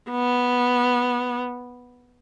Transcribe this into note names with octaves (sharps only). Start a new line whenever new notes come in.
B3